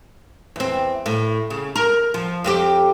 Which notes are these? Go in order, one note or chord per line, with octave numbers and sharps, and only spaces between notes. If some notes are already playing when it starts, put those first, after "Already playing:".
E2 C4
A2
C#3
A#4
F3
F2 C4 G4